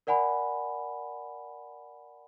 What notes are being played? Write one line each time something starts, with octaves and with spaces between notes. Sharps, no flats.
A#4 D5 F#5 G#5 B5